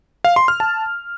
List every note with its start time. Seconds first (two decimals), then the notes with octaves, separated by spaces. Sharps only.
0.25 F5
0.36 C6
0.48 F6
0.60 A5